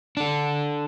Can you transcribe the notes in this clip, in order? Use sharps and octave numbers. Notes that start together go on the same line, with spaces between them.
D4 A4